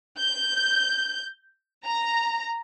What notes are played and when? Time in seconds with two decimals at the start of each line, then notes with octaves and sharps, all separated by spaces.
0.18 G6
1.85 A#5